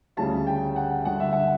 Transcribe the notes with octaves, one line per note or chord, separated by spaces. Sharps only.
D2 C#3 G3 A5
G5
F#5
G2 D3 G3 F#5
E5
F#5